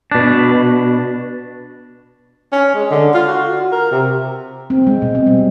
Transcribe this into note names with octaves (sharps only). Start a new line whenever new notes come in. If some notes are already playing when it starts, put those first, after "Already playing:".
B2 D4
C#4
G#3
D3
F4
F#4
A#4
C3
C4
G#3
B2
C4
G3